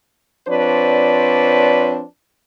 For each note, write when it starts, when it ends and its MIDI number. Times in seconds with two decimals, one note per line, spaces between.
0.47 2.02 53
0.47 2.02 60
0.47 2.02 62
0.47 2.02 71
0.47 2.02 73
0.47 2.02 74